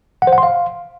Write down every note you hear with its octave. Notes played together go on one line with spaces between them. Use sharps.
F#5
C5
F#5
C6
F5